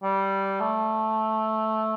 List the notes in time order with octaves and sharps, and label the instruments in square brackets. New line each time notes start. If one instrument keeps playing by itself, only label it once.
[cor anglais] G3
A3